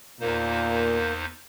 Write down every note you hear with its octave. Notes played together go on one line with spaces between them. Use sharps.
E2 A#2 A#3 D#4 C5